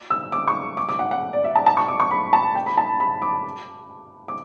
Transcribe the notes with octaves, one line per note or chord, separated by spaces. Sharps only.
E6
D6
C#6
D6
D6
F#5
F#5
D5
E5
A5
A5
C#6
D6
C#6
B5
A5
G5
B5
A5
B5
D6
D6